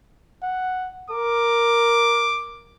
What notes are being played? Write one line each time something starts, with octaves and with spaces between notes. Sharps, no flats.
F#5
A#4 D6